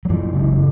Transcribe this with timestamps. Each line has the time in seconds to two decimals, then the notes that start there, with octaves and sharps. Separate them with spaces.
0.05 F#3
0.09 F#2 E3
0.34 C#3